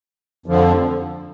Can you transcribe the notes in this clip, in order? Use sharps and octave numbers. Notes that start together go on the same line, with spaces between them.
F2 D3 F3